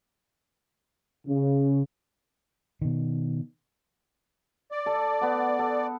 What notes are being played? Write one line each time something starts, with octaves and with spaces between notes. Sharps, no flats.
C#3
B2 D#3
D5
A4
B3 F#5
A4